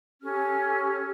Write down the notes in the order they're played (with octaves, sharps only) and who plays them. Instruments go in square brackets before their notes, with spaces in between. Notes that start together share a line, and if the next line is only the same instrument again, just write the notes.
[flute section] C#4 G4 A4 F6